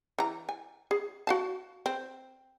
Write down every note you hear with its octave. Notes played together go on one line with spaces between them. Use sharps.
E3 A#5
G#5
G#4
F#4 F5 A5
C4